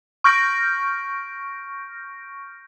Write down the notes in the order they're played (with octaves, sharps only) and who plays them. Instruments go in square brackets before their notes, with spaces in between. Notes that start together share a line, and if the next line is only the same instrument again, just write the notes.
[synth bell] C#6 F6 G6 A#6 D7